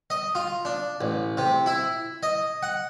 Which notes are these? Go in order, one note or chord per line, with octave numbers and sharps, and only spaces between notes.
D#5
F4
D4
A1
C3
E4
D#5
F#5